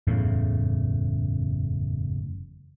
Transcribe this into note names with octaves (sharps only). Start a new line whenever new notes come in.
F#1 E2 A2 C#3